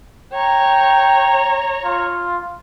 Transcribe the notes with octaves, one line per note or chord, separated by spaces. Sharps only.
C#5 G5 A#5
F4